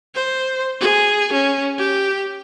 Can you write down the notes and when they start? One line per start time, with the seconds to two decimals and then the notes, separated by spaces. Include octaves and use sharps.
0.15 C5
0.81 G#4
1.32 C#4
1.78 G4